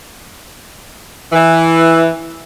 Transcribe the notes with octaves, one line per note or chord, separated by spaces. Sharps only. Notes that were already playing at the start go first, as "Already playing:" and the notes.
E3